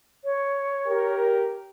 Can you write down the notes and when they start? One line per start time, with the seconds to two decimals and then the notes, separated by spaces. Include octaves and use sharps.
0.25 C#5
0.87 G4 A#4